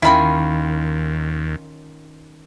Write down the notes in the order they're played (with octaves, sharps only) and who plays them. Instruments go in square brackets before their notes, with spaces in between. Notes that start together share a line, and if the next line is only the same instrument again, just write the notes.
[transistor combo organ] D#2 [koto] D#3 C#4 F4 [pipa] E4 B5